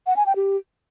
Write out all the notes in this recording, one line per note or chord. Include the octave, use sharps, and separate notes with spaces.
F#5
G#5
G5
G4